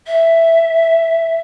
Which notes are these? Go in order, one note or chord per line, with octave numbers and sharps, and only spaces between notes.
E5